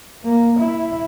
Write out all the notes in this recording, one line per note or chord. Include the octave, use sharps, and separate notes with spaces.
A#3
E4